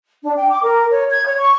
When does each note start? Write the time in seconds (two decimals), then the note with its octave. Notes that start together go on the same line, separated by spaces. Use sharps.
0.23 D4
0.37 G5
0.50 D6
0.63 A#4
0.91 C#5
1.11 G#6
1.26 C#5
1.39 C#6